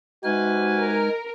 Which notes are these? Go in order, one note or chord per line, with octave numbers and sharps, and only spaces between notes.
C3 G#3 D#4 F#4 B4 G#5 F6
A#4